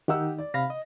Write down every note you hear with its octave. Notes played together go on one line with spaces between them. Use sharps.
D#3 D#4 G4 F#5 E6
D5
C3 F5 B5 A#6
D#5